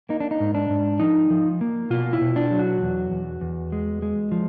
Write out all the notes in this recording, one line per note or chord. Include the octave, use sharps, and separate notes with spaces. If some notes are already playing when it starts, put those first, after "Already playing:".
A#3 D#4
D4
D#4
G#2
D4
G#2
F3 D#4
F3
A#3
B2 F4
E4
B2
D4
F#3
F#4
E2
E2
E2
G#3
G#3
F3